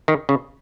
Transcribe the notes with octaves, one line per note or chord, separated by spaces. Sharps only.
D#3
C#3